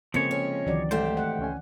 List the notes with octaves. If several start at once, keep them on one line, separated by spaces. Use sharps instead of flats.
C#3 F3 G#3 A#3 C4 C#4 A4 C#5
C#4
C#2 D#3 E3 F#3 D5
G#2 A3 G4 C5
F#5
C#2 C#4 G#5